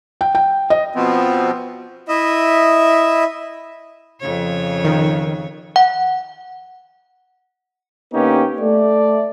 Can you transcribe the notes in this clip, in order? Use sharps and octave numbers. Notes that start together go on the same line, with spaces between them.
G5
G5
D#5
B2 F3 B3 C4
E4 D#5 E5
F2 C#3 C#5
D#3
F#5
D3 A#3 B3 C#4 D#4 G4
A3 D5